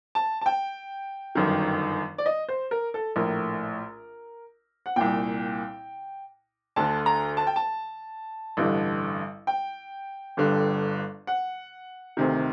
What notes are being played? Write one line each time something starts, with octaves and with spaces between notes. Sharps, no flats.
A5
A5
G5
G1 F#2 D#3
D5
D#5
C5
A#4
A4
A#1 A2 A#4
F#5
C2 A#2 G5
D2 D3 A5
A#5
A5
G5
A5
A1 G2 D3
G5
G1 G2 D3
F#5
D2 C3 D#3